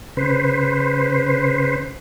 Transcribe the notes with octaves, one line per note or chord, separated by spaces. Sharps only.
C#3 B4 C5